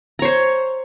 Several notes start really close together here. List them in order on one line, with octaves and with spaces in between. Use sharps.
A#5 C#5 C5 C#6